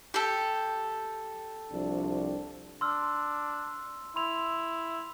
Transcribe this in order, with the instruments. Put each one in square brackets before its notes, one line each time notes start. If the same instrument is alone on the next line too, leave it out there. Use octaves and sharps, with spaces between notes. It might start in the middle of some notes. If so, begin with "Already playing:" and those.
[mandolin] G4 A4
[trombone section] C2 F3 D4
[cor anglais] D4 [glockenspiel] C6 E6 F6
[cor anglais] E4 [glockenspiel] C6 F7